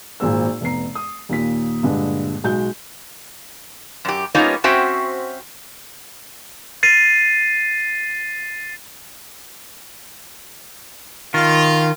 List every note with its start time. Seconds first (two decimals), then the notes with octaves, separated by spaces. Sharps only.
0.20 G#1 A#2 G#4 C5 E6
0.61 F1 B3 A#5 C7
0.95 D#6
1.29 D#2 A#2 B6
1.83 G2 A#2 D3 G#3
2.44 B1 G#3 F#4 G6
4.05 F#2 G4
4.35 G3 A#3 B3 C#4 D#4 F4
4.64 C4 C#4 F#4 C5 E5 G5
6.83 A6 C7 D#7
11.34 D#3 F4